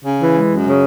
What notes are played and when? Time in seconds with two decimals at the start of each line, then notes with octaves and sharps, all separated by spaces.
0.04 C#3
0.20 E3
0.35 G#3
0.50 F#2
0.66 C#3